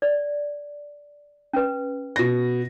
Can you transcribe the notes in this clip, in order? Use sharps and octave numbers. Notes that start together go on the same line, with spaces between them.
D5
C#4 B4
B2 A#6